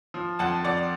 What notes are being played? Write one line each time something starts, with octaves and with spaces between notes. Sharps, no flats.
F3
F2 F#5 A5
F2 D5 F#5